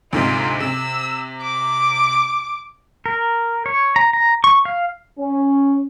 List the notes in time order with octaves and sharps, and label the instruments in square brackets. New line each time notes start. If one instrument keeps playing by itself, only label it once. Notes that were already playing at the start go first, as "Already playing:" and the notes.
[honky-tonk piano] D2 G#2 C3 [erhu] F4
[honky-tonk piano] C3 [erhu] E6
[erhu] D6
[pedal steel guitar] A#4
C#5
A#5
A#5
C#6
F5
[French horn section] C#4